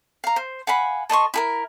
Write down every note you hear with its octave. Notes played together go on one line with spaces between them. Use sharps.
F5 A#5
C5
F5 F#5 G#5 B5
A4 D#5 C6 C#6
E4 G#4 A#4